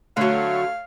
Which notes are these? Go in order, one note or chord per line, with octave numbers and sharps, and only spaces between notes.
D3 F#3 A3 C#5 F5